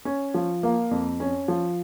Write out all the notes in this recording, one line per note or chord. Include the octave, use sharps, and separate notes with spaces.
C#4
F3
A#3
F2
C#4
F3